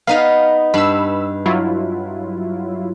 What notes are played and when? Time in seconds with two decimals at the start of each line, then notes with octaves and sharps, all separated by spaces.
0.07 B3 D#4 B4 F5
0.74 G2 B5 E6
1.46 F#3 E4 F4